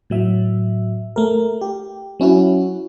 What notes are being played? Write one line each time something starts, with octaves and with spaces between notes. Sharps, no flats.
A2 F#3 E5
A3 A#4
G4
F#3 C#4 E4 F#4